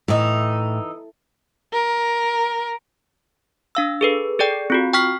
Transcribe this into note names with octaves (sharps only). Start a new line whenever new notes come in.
A2 E3 D#4
A#4
D4 F5 E6
G#4 A4 B4
G#4 A4 D5 G5
C4 F4 F#4
G5 C#6 F6 B6